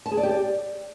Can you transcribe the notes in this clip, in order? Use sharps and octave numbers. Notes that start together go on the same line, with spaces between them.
A5
G#4
D5
G4
D5